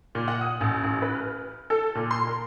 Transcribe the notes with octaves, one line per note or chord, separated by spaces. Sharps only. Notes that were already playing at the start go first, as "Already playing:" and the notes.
A#2
F#5
D#6
A1
A1
B4
F6
A4
A#2
C6
A#4